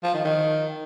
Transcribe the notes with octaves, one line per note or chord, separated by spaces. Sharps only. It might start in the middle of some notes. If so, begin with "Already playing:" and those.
F3
D#3
D#3